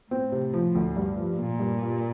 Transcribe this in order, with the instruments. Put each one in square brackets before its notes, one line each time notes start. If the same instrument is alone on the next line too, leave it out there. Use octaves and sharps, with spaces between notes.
[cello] A2 [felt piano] C4
[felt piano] C3
F3
D2
G2
F3
[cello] A#2 [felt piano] A#3
[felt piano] G2
F4